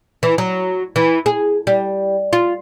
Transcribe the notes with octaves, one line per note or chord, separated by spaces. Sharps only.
E3
F#3
E3
G#4
G3
F4